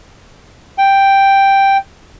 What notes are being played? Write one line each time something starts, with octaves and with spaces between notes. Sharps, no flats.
G5